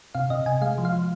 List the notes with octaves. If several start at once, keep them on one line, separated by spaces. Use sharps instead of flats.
C3 F5
C3 D#5
C3 G#5
G#3 F5
F3
F5
F3